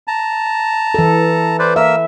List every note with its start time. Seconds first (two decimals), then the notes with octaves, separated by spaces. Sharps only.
0.08 A5 A#5
0.94 E3 A4
1.59 B4 C5 D5
1.76 A#3 A#4 E5 E6